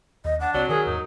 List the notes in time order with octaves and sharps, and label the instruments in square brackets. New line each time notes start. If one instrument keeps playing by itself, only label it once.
[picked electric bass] D#2 [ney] D#5
[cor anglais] D4 [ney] F#5
[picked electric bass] C#2 C4 [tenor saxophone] F#3 [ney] D5
[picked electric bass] D#3 [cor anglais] G#4 [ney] A#4
[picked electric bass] D#2 G#2 [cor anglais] D#4